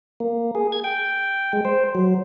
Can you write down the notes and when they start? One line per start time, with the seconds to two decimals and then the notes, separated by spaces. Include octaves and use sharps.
0.20 A#3
0.55 G#4
0.72 G#6
0.84 G5
1.53 G#3
1.65 C5
1.95 F#3